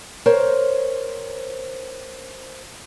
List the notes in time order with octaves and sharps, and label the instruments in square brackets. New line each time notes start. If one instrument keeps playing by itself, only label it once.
[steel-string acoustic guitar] A#4 C5 C#5